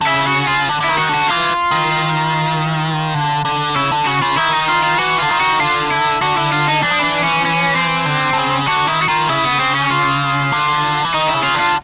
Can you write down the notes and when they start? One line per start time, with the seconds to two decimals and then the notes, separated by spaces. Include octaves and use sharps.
0.01 D3
0.06 C#3 E4
0.27 F#4
0.48 F4
0.69 D3
0.80 D3
0.84 D#3 E4
0.99 F#4
1.09 D3
1.14 F#4
1.29 E3 F4
1.71 D#3
3.15 D3
3.45 D3
3.75 C#3 E4
3.92 D3
4.06 C#3 F#4
4.22 C#3 F4
4.37 D#3 E4
4.52 D#4
4.68 F4
4.83 F4
4.98 E3 F#4
5.19 D3 F4
5.30 D#3
5.40 F#4
5.60 D3 F4
5.91 E4
6.21 D3 F#4
6.37 E4
6.52 F4
6.68 D#4
6.83 E3 D4
6.91 F3
6.99 E3
7.04 D4
7.24 C#4
7.45 C#4
7.75 C4
8.06 D3
8.33 D3
8.37 C#3
8.67 D3 F#4
8.88 D#3 E4
9.02 F#4
9.08 D#3 F4
9.29 C#3 E4
9.45 B3
9.59 C4
9.75 C#4
9.90 F4
10.52 D3
11.04 E3
11.14 D#3 D#4
11.29 E4
11.34 C#3
11.44 F4
11.55 D3
11.60 F4